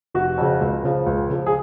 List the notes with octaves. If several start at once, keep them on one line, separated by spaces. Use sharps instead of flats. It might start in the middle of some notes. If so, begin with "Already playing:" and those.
F1 F#4
F2 C#3
C#2
C#3 F3
C#2
C#3 F3
G#4